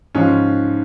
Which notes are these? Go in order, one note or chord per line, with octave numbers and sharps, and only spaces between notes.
G#2 F3 C#4